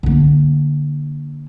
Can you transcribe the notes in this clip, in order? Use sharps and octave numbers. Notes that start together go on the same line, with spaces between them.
D3 A#3